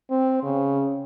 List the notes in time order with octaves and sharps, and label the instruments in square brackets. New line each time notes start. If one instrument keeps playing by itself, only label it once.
[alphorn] C4
C#3